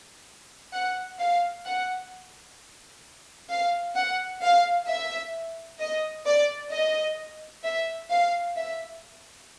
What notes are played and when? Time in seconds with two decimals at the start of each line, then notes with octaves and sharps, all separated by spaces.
0.73 F#5
1.19 F5
1.66 F#5
3.49 F5
3.95 F#5
4.42 F5
4.87 E5
5.79 D#5
6.26 D5
6.71 D#5
7.64 E5
8.10 F5
8.55 E5